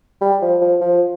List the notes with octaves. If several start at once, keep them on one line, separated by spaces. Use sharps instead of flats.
G3
F3
F3
F3